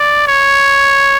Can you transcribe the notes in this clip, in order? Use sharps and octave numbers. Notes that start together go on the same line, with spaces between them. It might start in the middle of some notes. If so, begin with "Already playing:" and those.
Already playing: D5
C#5